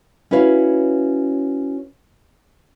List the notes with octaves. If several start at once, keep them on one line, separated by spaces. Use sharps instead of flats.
C#4 E4 F#4 B4 C#5 F5